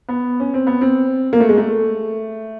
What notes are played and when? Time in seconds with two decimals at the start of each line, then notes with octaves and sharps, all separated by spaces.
0.09 B3
0.40 C#4
0.54 C4
0.67 B3
0.81 C4
1.33 A#3
1.40 A3
1.49 G#3
1.57 A3